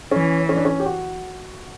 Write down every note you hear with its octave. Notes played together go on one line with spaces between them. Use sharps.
E3 C#4
C#4
D4
C#4
G4
F#4